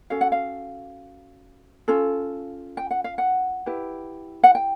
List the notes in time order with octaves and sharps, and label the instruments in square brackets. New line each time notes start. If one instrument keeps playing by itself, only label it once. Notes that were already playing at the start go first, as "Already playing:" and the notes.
[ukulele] C#4 F#4 A4 F5
F#5
F5
C#4 F4 A4
G5
F#5
F5
F#5
E4 G4 B4
F#5
G5